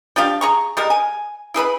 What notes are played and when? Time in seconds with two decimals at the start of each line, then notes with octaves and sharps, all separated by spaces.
0.16 F3 D4 G4 F5
0.41 G#4 A#5 C#6
0.77 G3 G#3 A#4
0.90 G#5
1.54 E4 G#4 B4 B5